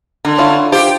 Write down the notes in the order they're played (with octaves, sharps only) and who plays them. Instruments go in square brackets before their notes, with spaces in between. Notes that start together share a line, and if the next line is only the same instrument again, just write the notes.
[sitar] D3 [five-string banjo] A#4
[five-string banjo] C#4 E4 F4
[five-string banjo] F4 C5 [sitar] G4